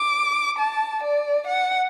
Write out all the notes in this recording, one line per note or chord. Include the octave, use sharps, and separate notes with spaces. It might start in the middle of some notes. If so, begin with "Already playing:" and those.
Already playing: D6
A5
D5
F#5